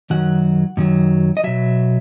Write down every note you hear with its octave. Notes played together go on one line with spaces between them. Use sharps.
F#2 D#3 F#3 F#5
F#2 D#3 F#3
D#5
B2 F#3 E5